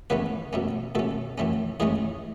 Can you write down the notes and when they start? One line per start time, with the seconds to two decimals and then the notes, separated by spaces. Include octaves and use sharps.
0.10 C#3 E3 A3 B3 C#4 B4
0.53 B2 A3 C#4
0.95 B2 A3 C#4 A4
1.38 A2 E3 A3 C#4
1.80 A2 E3 G#3 A3 C#4 G#4